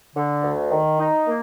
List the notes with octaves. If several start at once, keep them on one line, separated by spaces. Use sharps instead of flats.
D3
D2
D#3
D#4
A#3